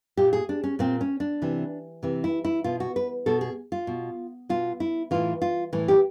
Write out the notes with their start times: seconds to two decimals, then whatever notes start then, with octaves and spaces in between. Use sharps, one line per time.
0.17 A#2 G4
0.33 G#4
0.49 D4
0.64 C#4
0.79 A#2 C4
1.01 C#4
1.20 D4
1.42 C3 E3
2.03 C3 E3
2.24 E4
2.45 E4
2.64 B2 F4
2.80 F#4
2.96 B4
3.26 B2 A4
3.41 G#4
3.72 F4
3.87 B2
4.49 B2 F4
4.80 E4
5.11 A2 E3 F4
5.42 F4
5.73 A2 E3
5.88 G4